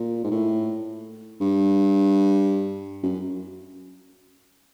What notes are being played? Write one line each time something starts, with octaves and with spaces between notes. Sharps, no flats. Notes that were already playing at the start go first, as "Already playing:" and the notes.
Already playing: A#2
G#2
A2
G2
F#2